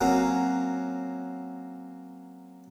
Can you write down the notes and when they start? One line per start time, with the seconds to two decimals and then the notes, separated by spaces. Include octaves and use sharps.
0.01 F#3 A#3 C4 C#4 F#4